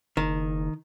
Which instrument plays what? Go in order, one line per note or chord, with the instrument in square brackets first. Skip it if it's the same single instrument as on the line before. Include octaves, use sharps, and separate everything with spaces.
[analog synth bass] F#1 [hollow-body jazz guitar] D#3